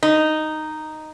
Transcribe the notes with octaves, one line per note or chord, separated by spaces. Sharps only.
D#4